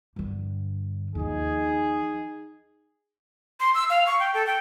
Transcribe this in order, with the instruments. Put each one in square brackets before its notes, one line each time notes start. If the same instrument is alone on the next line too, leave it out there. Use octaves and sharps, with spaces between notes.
[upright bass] G2 D3
[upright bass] D#2 F3 [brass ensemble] D#4 G#4
[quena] C6
E6
F5
C#6
G5
A4
G5